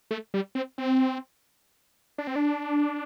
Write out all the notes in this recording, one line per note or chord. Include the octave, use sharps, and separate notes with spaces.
A3
G3
C4
C4
D4
C4
D4